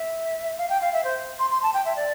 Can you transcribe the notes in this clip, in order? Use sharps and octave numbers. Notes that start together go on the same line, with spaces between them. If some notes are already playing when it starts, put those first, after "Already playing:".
Already playing: E5
F5
G5
F5
E5
C5
C6
C6
A5
G5
E5
D5